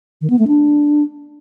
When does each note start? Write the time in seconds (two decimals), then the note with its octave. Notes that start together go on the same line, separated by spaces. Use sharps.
0.21 D#3
0.30 B3
0.39 A3
0.48 D4